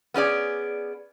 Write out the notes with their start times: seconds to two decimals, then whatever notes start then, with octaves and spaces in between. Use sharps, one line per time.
0.14 B3 C#4 G#4 D5